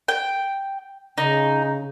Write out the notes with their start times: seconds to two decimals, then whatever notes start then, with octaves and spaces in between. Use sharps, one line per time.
0.08 G5
1.18 C#3 D#4